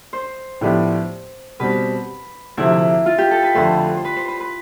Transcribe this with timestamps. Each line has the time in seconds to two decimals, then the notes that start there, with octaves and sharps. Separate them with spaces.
0.13 C5
0.61 A2 F3 B3 D4 G4
1.60 B2 G3 C4 B4
2.57 D2 C3 F3 E4
3.06 F4
3.18 G4
3.31 A4
3.43 B4
3.55 F2 D3 A3 C5
3.97 C5
4.04 B4
4.16 C5
4.28 B4
4.40 B4